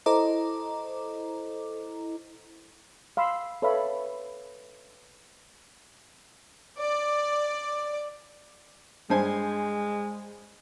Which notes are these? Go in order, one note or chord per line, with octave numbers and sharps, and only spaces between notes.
E4 A4 C5 D#5 A#5 D6
F5 B5 C6 E6
A4 B4 C#5 E5 F5 B5
D5
G2 G#3 C5 G#5